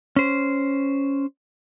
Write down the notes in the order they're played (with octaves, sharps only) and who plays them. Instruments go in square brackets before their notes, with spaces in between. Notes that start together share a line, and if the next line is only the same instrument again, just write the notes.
[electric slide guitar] C#4 C5